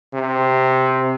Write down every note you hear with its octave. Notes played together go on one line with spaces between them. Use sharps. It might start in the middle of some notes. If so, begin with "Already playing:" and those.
C3